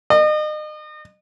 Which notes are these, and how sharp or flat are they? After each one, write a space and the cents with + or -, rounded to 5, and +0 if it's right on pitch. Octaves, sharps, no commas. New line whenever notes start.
D#5 -35